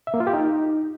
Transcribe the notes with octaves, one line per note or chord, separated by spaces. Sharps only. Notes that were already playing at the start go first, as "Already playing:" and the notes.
E5
A#3
F4
G4
D#4